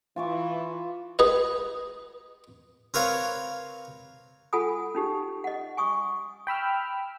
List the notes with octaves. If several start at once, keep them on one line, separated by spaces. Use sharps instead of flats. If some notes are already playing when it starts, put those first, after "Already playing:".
E3 F4 C#6 D6
G#4 B4 D#5
C4 A#4 B4 C#5 F5
F4 A4 F#5 G#5 B5 D#6
C#4 D#4 G4
D#5 F#5
G#5 C#6 D#6
G5 B5 E6 F6